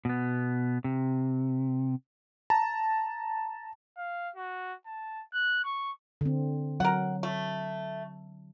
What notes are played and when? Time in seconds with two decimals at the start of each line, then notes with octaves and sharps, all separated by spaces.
0.05 B2 B3
0.84 C3
2.50 A5 A#5
3.98 F5
4.36 F#4
4.87 A5
5.33 F#6
5.64 C#6
6.21 D3 C4
6.80 F#3 A#4 F#5
7.23 A3